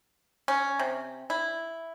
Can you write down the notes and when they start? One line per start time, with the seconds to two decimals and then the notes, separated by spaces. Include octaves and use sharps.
0.48 C#4
0.79 C3
1.30 E4